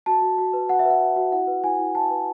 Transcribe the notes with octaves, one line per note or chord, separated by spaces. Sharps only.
F#4 A5
F#4
F#4
B4
F#4 F#5
E5
B4
F#5
F#4
F#4
E4 F#5
B4
E4 G#5
E4
E4 A5
B4